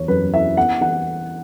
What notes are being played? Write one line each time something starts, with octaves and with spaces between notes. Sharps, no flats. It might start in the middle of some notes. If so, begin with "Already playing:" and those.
Already playing: E2 E3 B3 C#5
F#2 B4
E4 E5
B3 F#5
E3 F#5